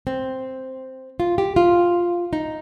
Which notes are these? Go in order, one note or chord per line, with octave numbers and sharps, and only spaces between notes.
C4
F4
G4
F4
D#4